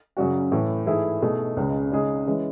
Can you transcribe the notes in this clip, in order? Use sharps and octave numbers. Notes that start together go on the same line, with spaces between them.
F#2 C#3 F#3 C#4 F#4
A2 E3 A3
G#2 E3 A3 E4 G#4
B2 A3 D#4 G#4
C#2 C#3 G#3
C#3 G#3 D#4 G#4
E3 G#3 C#4